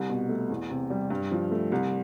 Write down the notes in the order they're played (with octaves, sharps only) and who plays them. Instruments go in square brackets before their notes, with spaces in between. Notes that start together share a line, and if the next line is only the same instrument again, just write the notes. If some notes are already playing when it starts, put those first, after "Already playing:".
Already playing: [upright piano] C2
B2
A3
E2
C3
G3
G2
F3
A3
C2